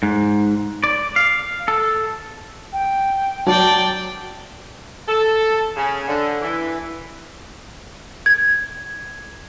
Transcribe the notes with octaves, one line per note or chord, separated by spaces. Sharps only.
G#2
D5
F5
A4
G5
F#3 D5 G5 A5
A4
C#3
D3
E3
G#6